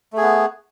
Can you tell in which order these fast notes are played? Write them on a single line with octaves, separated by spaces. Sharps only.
A3 G#4 B3